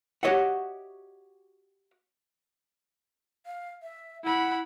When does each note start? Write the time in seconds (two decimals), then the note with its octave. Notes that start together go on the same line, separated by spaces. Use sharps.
0.23 F#4 G4 C#5 D#5 E5 F#5
3.46 F5
3.82 E5
4.24 E4 F#5 B5